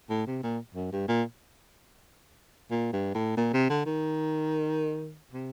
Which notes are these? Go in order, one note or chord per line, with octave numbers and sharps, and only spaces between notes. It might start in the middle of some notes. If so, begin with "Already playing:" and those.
A2
C3
A#2
F#2
G2
A#2
A#2
G2
A2
A#2
C3
D3
D#3
C3